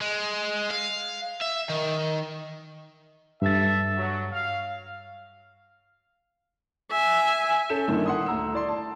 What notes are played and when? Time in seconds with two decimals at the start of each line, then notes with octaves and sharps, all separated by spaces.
0.01 G#3
0.71 F5
1.42 E5
1.69 D#3
3.42 G2 A4 E5 A6
3.97 F#3
4.32 F5
6.91 E5 G#5
7.70 C#4 A4 A5 G6 E7
7.88 G1 A#2 D3 D#3 E4
8.06 F#5 C6 D#6
8.26 D2 A#5 E6
8.53 E4 D5 C6
8.68 A5